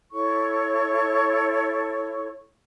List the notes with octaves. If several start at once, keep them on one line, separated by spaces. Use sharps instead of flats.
E4 A4 C#5 C#6